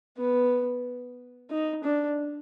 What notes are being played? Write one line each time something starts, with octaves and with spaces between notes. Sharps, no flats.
B3
D#4
D4